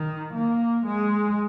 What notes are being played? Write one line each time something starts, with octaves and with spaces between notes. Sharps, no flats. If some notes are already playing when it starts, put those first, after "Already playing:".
Already playing: D#3
A#3
G#3